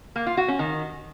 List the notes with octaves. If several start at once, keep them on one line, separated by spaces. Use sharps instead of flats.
A#3
F4
F#4
C#4
D#3